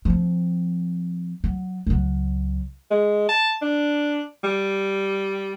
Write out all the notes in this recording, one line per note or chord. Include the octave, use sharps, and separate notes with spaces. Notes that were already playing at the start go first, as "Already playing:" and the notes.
F3 C4
F#3
C#2 F#3
G#3
A5
D4
G3